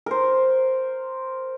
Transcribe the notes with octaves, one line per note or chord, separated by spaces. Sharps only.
A#4 C5